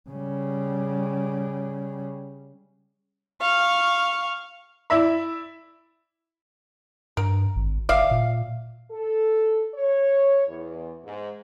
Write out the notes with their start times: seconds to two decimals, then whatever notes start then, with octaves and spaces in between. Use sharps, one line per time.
0.10 C#3 G3
3.41 F5 C#6
4.90 E4 D5 E5 B5
7.17 G2 A#4
7.56 G#1
7.89 G1 D5 E5 F5
8.11 A#2
8.91 A4
9.75 C#5
10.48 E2
11.05 G#2